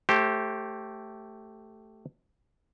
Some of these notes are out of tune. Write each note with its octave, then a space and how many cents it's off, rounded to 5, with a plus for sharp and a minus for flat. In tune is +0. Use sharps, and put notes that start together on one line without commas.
A3 +0 G4 -15 C5 +30